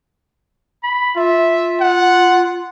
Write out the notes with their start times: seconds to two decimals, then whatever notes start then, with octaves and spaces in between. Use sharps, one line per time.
0.83 B5
1.16 F4 E5
1.80 F#5